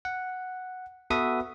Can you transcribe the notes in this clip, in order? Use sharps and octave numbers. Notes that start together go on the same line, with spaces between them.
F#5
B3 F#4 A4 B4 E5 D#6